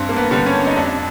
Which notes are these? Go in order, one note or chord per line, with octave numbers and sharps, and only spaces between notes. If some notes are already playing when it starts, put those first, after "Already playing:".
Already playing: G2 C4
A#3
B3
D3 G3
C#4
D#4
F2 D4